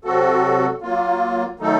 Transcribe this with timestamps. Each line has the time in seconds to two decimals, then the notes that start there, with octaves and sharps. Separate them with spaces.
0.04 C3 F#3 C4 F#4 A4
0.82 F#3 A#3 F4
1.59 D#3 F#3 A3 D#4 A4